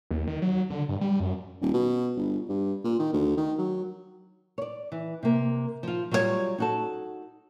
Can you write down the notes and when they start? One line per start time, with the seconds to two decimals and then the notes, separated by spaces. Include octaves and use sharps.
0.11 D#2
0.27 D#3
0.42 F#3
0.70 D3
0.89 G2
1.01 G3
1.20 F#2
1.62 D#1
1.73 B2
2.16 G1
2.49 G2
2.84 A#2
2.99 D#3
3.13 D2
3.37 D#3
3.58 F#3
4.58 C#5 D5
4.92 E3
5.23 C3 A#3
5.83 F3 F4
6.11 F#3 G3 F4 F#4 C#5
6.58 D#4 F#4 A4